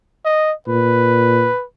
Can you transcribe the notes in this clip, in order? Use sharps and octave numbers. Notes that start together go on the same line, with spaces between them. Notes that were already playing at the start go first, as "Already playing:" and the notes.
D#5
A#2 B4